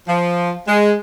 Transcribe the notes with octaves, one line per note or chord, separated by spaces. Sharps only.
F3
G#3